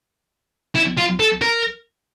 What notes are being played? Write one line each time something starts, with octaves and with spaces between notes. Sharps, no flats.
E4
F4
A4
A#4